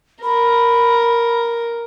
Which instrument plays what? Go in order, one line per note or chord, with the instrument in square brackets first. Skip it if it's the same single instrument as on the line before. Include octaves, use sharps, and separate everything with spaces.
[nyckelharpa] A#4 [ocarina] B5